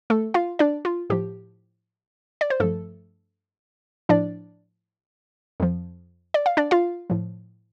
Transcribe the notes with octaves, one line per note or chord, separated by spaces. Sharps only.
A3 A4
F4 F5
D4 D5
F4
A2 F3 G4
D5
C5
G2 F3 A3 A4
A2 F3 D4 D5
F2 F3
D5
F5
D4 D5
F4 F5
A2 F3